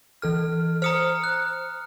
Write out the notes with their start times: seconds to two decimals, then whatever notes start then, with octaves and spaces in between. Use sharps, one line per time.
0.22 E3 A4 F6
0.82 C5 A#5 D#6 F6 C#7
1.24 F#6